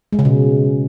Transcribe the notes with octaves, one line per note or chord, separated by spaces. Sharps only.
G#3
C#3
B2